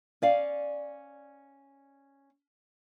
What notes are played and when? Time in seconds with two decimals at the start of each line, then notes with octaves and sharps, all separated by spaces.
0.22 C#4 D5 F5